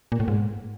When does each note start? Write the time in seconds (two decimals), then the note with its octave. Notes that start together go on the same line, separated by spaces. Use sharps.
0.12 A#2
0.20 A2
0.28 G#2